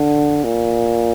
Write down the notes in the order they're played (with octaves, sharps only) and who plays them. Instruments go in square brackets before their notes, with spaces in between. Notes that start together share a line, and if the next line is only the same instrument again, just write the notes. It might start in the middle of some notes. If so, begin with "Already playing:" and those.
Already playing: [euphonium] D3
A#2